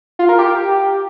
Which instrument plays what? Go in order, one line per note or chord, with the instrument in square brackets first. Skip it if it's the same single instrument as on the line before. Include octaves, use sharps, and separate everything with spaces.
[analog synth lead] F4
A#4
G4